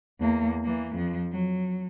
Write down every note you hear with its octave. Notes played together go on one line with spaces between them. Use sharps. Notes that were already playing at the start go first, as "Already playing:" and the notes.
E2 A#3
E3 A#3
F2 F3
F#3